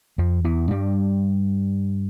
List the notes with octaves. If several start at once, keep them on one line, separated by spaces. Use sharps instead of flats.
F2 F3
E2 E3
G2 G3